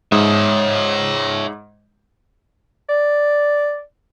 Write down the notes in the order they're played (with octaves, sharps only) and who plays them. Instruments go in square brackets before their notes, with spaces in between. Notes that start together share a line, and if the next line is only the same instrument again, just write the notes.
[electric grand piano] G#2 D#6 [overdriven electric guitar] C#5 E5
[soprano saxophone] D5